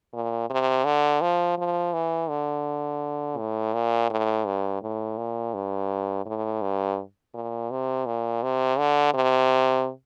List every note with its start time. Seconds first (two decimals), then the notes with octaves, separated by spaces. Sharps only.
0.13 A#2
0.50 C3
0.85 D3
1.21 F3
1.58 F3
1.93 E3
2.29 D3
3.38 A2
3.74 A#2
4.10 A2
4.46 G2
4.82 A2
5.17 A#2
5.54 G2
6.26 A2
6.62 G2
7.34 A#2
7.71 C3
8.06 A#2
8.43 C3
8.79 D3
9.14 C3